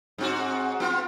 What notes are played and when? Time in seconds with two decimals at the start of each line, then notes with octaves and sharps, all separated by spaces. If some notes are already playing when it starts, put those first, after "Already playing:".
0.18 G#2 C4 F#4
0.80 B3 F4